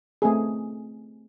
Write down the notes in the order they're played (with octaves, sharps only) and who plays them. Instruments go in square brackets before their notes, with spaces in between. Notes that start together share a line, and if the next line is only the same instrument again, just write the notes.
[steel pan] A3 C4 G#4